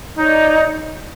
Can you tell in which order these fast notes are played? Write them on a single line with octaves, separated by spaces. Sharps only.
D#4 C#5 D5